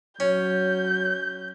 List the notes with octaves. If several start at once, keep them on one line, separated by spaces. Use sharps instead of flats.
F#3 C#4 G6